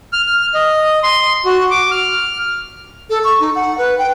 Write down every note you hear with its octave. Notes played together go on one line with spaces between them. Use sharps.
F6
F6
D#5
C6
F#4
D6
F6
A4
C#6
D#4
F#5
B4
G5